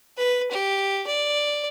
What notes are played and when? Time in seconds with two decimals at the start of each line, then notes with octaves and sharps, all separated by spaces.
0.17 B4
0.51 G4
1.07 D5